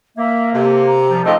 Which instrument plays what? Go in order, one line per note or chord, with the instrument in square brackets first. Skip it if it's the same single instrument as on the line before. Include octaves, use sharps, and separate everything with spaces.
[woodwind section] A#3 [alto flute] E5
[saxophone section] C3 [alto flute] A4
[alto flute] A#5
[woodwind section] C2 F3
[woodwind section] F2 C4 [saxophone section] D#3 F3 A3 [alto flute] D#5